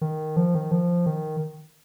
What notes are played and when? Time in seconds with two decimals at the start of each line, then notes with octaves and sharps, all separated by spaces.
0.01 D#3
0.36 F3
0.54 D#3
0.71 F3
1.06 D#3